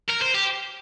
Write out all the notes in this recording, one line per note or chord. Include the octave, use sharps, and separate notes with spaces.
A#4
C5
G4